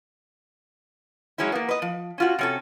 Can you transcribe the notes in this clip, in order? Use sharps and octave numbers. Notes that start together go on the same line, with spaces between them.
F#3 G#3 C#4 D#4 E4
A#3 B3
B4 D#5
F3
C#4 F4 F#4
C3 C#4 A4